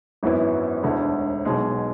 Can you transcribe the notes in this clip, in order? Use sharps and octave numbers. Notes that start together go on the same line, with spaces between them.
G#1 F#2 E3 B3 E4
E1 D2 D3
B1 B2 G#3